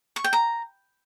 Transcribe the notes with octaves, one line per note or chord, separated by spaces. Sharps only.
C#6
G5
A#5